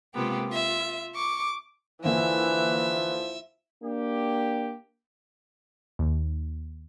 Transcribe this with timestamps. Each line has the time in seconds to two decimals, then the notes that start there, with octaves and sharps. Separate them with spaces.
0.14 C3 G#3 A#3 B3 F4 G4
0.46 F4 E5
1.14 C#6 D6
2.04 E2 D3 E3 F3 A#3 E5
3.83 A#3 D4 G4
5.99 D#2